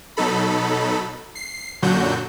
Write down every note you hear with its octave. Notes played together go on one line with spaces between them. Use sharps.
B2 F#3 D#4 A4 B5
C7
F#2 A#2 D3 F#3 F#4 G6